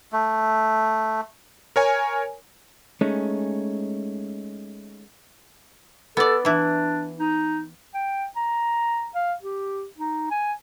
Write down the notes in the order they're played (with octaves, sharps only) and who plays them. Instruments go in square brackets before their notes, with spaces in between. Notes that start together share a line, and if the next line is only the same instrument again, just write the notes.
[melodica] A3
[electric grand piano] A#4 C#5 G#5
[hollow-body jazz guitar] G#3 A3 C#4 D#4
[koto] B3 D5 [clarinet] A4
[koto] E3 E4 [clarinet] D4
[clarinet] D#4
G5
A#5
F5
G4
D#4
G#5